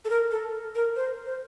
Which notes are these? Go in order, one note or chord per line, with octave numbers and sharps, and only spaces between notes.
A4
A#4
A4
A#4
C5
C5